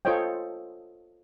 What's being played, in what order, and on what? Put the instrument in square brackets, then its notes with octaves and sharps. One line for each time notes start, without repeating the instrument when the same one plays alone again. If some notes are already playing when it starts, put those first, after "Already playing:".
[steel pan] F4 A4 C5 C#5 D#5 G5